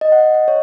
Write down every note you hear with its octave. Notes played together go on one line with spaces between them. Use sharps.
D#5
F#5
D#5
C#5